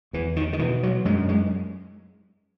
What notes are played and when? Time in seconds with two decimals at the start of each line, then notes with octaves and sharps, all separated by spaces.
0.13 E2 E3
0.36 D#3
0.53 D#3
0.59 B2 E3
0.83 F#3
1.05 F#2 G#3
1.29 G#3